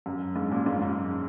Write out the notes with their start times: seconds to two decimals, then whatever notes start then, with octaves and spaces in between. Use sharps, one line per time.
0.06 F#2
0.36 G#2
0.51 F#2 A#2
0.66 G#2
0.82 F#2